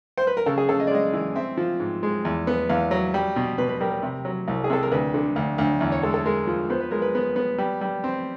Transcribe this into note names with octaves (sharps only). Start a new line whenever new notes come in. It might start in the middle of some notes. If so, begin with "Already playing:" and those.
C5
B4
A#4
C#3 A4
G#4
C#3 A4
D#5
D5
G#3 D#5
E3
C4 E5
F3
G#2
G#3
E2
B3
E2 F5
F#3
G3
B2
B2 B4
B4
G3 A#4
A#4
C3
F#3
C2
G#4
C3 A4
A#4
D2 B4
D3
D2
D2
E2
C#5
G#3 A4
A4
G#3 A#4
F3
B3 C5
B4
G#3 A#4
B4
B3
B3
G3
G3
C4